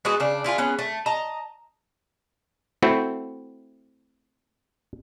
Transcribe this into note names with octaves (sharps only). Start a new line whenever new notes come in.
G#3 B3 F#4 G#4
C#3 D4
E4 F4 G4 G#4
B3 C#4 G#4
A3
D#5 A5 A#5
A3 C4 E4 F#4